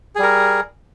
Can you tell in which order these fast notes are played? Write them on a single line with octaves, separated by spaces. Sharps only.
G#4 G3 A#4